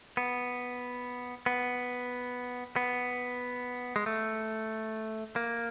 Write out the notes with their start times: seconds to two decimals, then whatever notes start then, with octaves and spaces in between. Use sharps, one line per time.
0.17 B3
1.46 B3
2.76 B3
3.96 G#3
4.06 A3
5.36 A#3